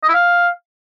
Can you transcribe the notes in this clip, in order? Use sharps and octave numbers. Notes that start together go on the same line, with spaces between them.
D#5
E4
F5